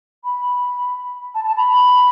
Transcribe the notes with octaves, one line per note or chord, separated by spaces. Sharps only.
B5
A5
A5
B5